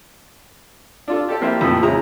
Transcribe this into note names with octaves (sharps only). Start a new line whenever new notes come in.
D4 F4 A4
G4 A4 D5
F3 A#3 C4 E4 F4 G4
F2 A#2 D#3 E3 A3
C#3 F3 G#3 E4 A#5